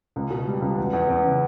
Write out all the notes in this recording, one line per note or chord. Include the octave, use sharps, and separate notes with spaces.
C#2
B2
G3
C#2
E2
E2
E2
C#3